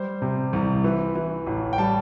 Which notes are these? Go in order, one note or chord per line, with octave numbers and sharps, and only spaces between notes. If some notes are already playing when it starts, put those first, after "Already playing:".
Already playing: G3 C5
C3
C2
E3
E3
A1
G5
G3 A5